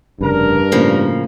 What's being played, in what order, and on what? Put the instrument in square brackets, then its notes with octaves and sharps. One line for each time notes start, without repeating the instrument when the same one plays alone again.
[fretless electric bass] F1 C#3 [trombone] G2 [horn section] D4 A#4
[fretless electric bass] A2 [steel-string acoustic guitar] C#3 F3 A#3